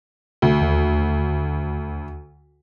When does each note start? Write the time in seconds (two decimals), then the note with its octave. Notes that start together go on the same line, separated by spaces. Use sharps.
0.42 D2
0.61 D#2